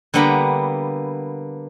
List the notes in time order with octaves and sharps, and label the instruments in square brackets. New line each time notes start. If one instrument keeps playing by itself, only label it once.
[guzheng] D3 G3 A#3 B3 A#5 B5